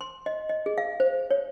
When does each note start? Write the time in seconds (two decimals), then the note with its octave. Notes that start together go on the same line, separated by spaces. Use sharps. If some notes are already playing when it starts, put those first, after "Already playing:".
0.01 C6
0.26 D#5
0.49 D#5
0.66 G#4
0.78 F5
1.00 C5
1.31 C#5